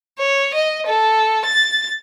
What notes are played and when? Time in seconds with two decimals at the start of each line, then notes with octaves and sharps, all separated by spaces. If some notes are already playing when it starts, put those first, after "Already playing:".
0.18 C#5
0.54 D#5
0.86 A4
1.45 A6